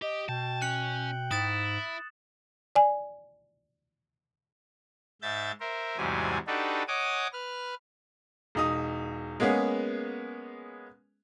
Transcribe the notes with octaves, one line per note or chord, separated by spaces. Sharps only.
G4 D#5
B2 G5 A5
C#4 F#6 C#7 F#7
G#2 E4 D#6 A6 E7
D5 G#5
G#2 E5 G6 A6
A#4 C5 E5
E2 G#2 C3 F#3 G3 G#5
D4 D#4 F#4 G4 A4 B4
C#5 D#5 F#5 G#5 D6 D#6
B4 F6
E1 D#4 D#6
G#3 A#3 B3 C#4 G#4